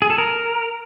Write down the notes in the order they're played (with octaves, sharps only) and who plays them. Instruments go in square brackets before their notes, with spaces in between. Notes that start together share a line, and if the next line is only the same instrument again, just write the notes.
[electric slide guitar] G#4
A4
A#4